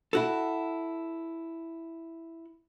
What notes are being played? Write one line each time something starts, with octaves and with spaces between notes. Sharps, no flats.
E4 F#4 A4